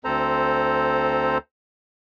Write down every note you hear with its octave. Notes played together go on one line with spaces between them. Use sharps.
D2 C4 A4 C5 A#5